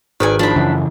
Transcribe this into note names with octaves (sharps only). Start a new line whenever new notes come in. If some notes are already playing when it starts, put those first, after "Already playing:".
G#1 D#3 B4 D5 G#5
F3 D4 C5 B5
F#2 C#3 E3